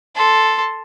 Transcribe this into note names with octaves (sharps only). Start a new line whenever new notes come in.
A4 C6